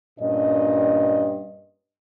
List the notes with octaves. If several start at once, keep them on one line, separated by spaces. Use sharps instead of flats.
G2 A#2 C#4 D#5